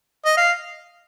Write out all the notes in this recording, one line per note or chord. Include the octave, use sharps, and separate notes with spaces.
D#5
F5